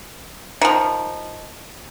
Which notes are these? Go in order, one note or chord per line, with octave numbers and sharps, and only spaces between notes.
D#3 F3